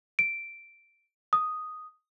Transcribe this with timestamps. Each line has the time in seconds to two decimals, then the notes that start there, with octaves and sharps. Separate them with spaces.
0.19 D7
1.33 D#6